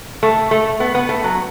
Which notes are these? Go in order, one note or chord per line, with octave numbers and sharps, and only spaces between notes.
A3
A3
B3
B3
A3
F#3